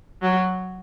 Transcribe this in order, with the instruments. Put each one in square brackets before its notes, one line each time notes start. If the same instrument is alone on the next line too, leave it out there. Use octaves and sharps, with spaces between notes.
[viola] F#3